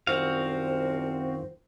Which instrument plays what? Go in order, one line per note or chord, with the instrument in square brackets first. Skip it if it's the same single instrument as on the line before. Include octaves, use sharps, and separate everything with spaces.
[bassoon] C2 [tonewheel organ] F#2 D#3 F4 [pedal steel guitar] C4 F#4 F5 [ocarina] C5